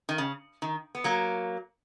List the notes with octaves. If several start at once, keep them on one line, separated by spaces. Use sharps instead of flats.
D#3
C#3
D#3
B3
F#3 A#3